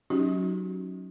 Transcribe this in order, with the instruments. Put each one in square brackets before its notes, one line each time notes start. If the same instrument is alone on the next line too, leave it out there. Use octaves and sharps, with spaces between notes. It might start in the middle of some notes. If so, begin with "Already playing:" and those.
[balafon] F#3 C#4 D#4 F#4 G4